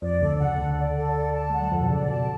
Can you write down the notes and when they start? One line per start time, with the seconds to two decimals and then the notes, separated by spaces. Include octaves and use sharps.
0.02 F2 F3 D5
0.21 D2 D3 A4
0.39 C#3 F#5
0.59 D2 D3 A4
0.78 D5
0.97 A4
1.15 D5
1.34 A5
1.50 G#3 F#5
1.61 F#3
1.71 F2 F3 A4
1.81 B2
1.89 C#3 D5
2.08 B2 A5